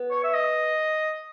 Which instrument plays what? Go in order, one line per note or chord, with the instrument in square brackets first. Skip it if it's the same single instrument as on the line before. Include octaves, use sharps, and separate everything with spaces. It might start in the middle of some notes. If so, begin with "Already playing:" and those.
Already playing: [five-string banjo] B3
[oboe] C#5
E5
D#5